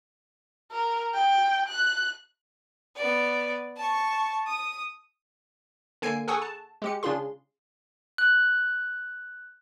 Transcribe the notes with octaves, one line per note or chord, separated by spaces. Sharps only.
A#4
G5
F#6
B3 D5
A5 C#6
D#6
D3 A#3 G#5 G#6 C7 D7
G#4 A4 F#5 G#5 C#6 D#6
A5
G#3 G4 C#7
C#3 D4 F4 G#4 C6
F#6